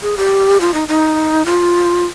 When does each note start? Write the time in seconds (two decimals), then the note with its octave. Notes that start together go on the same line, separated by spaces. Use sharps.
0.02 G#4
0.17 G4
0.61 F4
0.74 D#4
0.88 D#4
1.46 F4